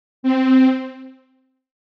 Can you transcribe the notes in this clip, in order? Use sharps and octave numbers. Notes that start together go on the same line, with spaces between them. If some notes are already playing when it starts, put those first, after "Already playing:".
C4